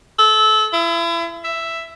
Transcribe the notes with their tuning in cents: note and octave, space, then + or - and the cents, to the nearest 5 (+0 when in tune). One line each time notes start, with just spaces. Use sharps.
A4 -25
E4 +35
E5 +5